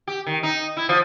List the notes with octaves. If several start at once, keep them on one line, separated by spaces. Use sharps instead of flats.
G4
D#3
D#4
E4
F3